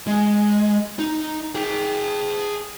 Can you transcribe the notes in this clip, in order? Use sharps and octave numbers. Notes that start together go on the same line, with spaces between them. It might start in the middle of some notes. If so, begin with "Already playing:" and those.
G#3
D#4
G#4 G5